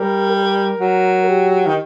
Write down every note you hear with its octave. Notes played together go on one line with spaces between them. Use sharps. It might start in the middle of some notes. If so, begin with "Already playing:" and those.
Already playing: G3 A#4
A#4
F#3
G4
D#3